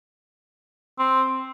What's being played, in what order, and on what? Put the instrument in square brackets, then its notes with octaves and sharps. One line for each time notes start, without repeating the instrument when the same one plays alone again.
[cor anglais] C4